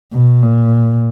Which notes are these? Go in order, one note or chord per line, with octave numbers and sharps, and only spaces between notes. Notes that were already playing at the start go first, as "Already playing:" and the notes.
B2
A#2